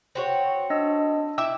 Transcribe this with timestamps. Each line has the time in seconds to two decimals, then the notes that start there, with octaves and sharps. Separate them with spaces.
0.15 C4 F#4 C#5
0.70 D4 D#5 E6
1.38 E4 E5 G5 D6 E6